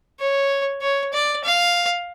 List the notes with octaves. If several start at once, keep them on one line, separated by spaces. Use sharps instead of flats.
C#5
C#5
D5
F5